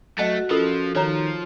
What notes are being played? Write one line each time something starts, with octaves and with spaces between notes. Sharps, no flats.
F#3 A3 F#4 D#5 F#5 A5
F3 C#4 F4 A4 A#4
D#3 F3 D#4 C#5 A#5